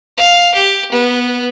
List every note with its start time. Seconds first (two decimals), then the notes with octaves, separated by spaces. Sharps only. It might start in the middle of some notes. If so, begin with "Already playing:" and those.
0.18 F5
0.54 G4
0.92 B3